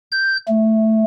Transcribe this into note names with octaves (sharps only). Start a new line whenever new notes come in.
G6
A3